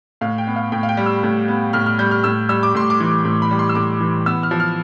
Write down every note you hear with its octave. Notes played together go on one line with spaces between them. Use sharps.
A2 F5
G5
B3
F5
A2 G5
F5
G5
G3
E6
A2
B3
A2 F6
F6
G3 G6
F6
A2 E6
G3 E6
D6
A2 C6
D6
E3
A2
B5
G3
C6
E6
A2 D6
E3
B3 E6
F6
F3
F6